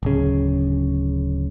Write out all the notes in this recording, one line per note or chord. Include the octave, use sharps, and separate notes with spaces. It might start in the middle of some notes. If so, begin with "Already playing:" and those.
D1 C#3